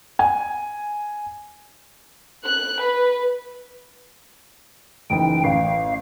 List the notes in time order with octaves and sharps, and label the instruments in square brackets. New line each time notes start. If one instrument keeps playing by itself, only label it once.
[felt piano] G#5
[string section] F#6
B4
[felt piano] F#1 E3 D#4 [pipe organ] G5
[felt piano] A1 [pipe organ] F5